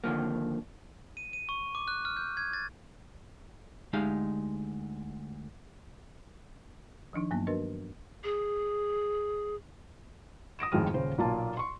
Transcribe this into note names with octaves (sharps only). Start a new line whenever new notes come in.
D3 D#3 F3 A#3
D#7
D#7
C#6
D6
F#6
F6
G6
G#6
A6
D2 G#3 D#4 G4 F5
D#3 F3 D4 D#4
G2 F#3 A#3 B3
D4 F#4 A#4 B4 D#5
G#4
D#6 A#6 D7 E7
F2 A2 D#3 G#3 F6 D#7
D#1 C#3 C5
B1 A#2 A#3 F4 A5
C6 C#6